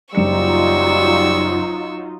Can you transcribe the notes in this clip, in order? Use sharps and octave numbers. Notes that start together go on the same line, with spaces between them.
F#1 F#3 G3 D#4 F4 C#6 E6 C#7